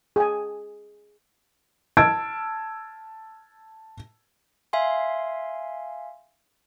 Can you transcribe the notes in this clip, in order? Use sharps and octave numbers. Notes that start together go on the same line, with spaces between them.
G#4 G#5
A5 E6 G#6 D7
E5 F5 G#5 C6